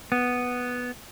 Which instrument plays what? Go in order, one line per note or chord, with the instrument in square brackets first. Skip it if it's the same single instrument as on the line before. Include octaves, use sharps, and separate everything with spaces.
[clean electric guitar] B3